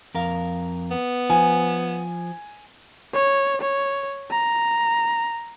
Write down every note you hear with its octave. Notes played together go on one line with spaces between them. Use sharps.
F2 A#4 F5
B3
F3 G#5
C#5
C#5
A#5